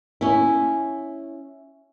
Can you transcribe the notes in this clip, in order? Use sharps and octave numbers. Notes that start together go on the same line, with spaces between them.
C#4 E4